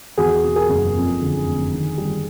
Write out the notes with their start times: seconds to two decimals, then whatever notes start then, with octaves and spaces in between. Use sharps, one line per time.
0.17 E2 F#4 G#4
0.43 B2
0.56 G#4 A#4
0.69 F#1
0.95 F2
1.20 D3
1.46 F1
1.72 D#3
1.97 G3